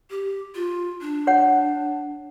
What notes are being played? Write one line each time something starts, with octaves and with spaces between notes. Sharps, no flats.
G4
F4
D4
C#5 F#5